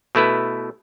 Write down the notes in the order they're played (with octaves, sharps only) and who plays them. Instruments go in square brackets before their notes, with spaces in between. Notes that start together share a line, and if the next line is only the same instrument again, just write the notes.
[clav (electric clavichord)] B2 A3 E4 B4